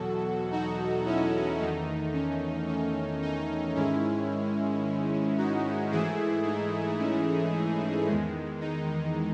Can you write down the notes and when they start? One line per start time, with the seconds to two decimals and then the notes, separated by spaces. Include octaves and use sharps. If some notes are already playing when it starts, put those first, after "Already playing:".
Already playing: E2 B2 F#3 F#4 A4
0.52 D#4 F#4
1.06 C#4 E4
1.59 E2 D#3 A3 D#4
2.13 C#4
2.68 C#4
3.22 D#4
3.75 G#2 D#3 G#3 C#4 E4
5.38 D#4 F#4
5.91 G#2 E3 A3 E4 G#4
6.45 D#4
6.99 C#4 E4
8.08 E2 D#3 G#3
8.61 D#4